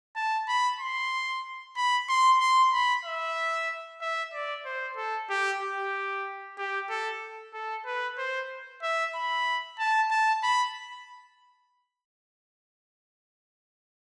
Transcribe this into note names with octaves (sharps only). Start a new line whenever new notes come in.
A5
B5
C6
B5
C6
C6
B5
E5
E5
D5
C5
A4
G4
G4
G4
A4
A4
B4
C5
E5
B5
A5
A5
B5